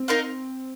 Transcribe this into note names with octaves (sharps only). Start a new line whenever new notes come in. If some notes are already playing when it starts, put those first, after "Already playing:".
Already playing: C4
D#4 A#4 F5